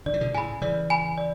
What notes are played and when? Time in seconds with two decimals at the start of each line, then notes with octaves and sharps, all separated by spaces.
0.06 D3 D5
0.14 E3
0.20 B2 D3
0.34 A2 C#3 G#5 B5
0.61 C#3 E3 D5
0.90 G#5 B5
1.18 D5